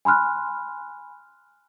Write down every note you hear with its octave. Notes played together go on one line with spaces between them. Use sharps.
G#5 B5 C6 F6 F#6